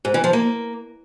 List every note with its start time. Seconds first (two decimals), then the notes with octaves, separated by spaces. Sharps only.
0.05 G#2
0.14 E3
0.24 F3
0.33 A#3